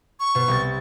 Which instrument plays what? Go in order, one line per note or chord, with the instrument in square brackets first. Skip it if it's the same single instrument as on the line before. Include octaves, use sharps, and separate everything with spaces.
[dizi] C#6
[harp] B2
C2 A6